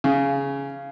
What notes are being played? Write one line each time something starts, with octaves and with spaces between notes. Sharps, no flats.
C#3